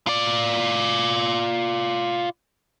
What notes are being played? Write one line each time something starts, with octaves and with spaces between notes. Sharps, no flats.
F4 D5